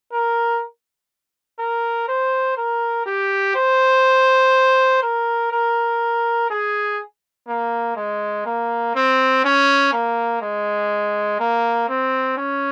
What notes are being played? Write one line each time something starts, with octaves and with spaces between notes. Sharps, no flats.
A#4
A#4
C5
A#4
G4
C5
A#4
A#4
G#4
A#3
G#3
A#3
C4
C#4
A#3
G#3
A#3
C4
C#4